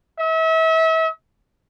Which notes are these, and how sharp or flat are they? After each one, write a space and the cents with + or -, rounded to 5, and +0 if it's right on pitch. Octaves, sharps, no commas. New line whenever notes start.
E5 -35